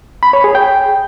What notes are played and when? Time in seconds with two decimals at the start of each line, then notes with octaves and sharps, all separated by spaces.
0.23 B5
0.33 C#5
0.44 G#4
0.55 G5